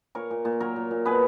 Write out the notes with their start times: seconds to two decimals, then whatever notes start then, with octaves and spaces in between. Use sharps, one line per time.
0.15 A#2 A#4 C#5
0.31 A#2
0.45 A#2
0.60 F#3 A#4 C#5
0.76 A#2
0.91 A#2
1.05 B2 G#4 B4